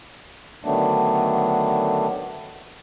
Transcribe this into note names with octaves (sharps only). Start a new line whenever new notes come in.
D3 D#3 F#3 A3 B3 D4